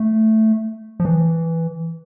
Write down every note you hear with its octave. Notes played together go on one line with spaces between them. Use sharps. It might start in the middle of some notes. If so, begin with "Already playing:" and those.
Already playing: A3
F3
E3